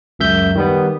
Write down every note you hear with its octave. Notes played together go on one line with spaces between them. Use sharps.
C#2 F#2 E5 G6
D#3 G3 B3